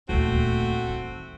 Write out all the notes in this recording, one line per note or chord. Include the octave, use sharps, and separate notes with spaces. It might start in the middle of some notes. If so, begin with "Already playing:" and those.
D#1 D2 A3 C4 F#4
D#3